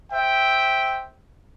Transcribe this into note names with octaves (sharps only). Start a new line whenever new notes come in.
C5 E5 G5